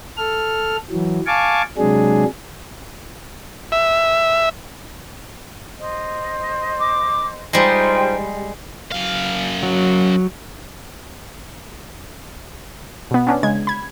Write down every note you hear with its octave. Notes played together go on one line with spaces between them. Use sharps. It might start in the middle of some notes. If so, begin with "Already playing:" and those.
A4 F6
E3 F#3
F5 G#5 A5 C#6 D6
C3 F#3 G#3 D4 G#4
E5
C5 D#5
D6
G3 G#3 D#4 F4 C5 G5
F#2 F5
F#3
B2 B3
B3 C#4 D4
C#3 G#3 G#6
B5 G#6